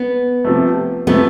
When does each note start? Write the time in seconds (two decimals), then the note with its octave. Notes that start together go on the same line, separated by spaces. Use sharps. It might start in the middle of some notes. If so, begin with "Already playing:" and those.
Already playing: B3
0.44 C3 F3 A3
1.07 C3 F3 A3 B3